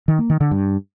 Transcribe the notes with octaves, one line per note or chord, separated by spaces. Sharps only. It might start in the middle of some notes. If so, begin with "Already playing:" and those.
D#3
A#3
D#3
D3
G2